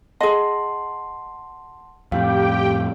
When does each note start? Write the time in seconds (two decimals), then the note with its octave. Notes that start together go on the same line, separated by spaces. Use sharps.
0.21 G#4 D#5 F#5 A5 C6
2.12 F2 A2 G4 F5 G5